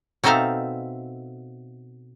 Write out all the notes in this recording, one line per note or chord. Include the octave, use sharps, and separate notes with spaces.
B2 C4 D#4 A4 E5 F5